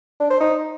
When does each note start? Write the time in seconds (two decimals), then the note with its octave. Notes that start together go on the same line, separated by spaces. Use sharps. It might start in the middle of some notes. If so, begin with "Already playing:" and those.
0.20 D4
0.30 C5
0.40 D#4